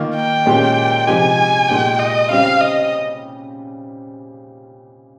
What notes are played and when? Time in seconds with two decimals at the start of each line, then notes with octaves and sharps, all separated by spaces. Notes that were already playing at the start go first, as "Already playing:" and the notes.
Already playing: D#3 A#3 F4
0.15 G5
0.46 A#2 G#3 C#4 G4
1.07 C3 F3 G#3 D#4 G4 G#5
1.68 A#2 G#3 D#4 G4 G5
1.99 D#5
2.30 C#3 G3 C4 G4 F5
2.60 D#5